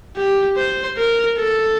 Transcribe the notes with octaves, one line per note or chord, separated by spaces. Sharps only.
G4
C5
A#4
A4